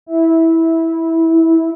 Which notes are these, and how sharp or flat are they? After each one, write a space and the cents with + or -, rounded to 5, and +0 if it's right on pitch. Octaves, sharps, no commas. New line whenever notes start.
E4 -15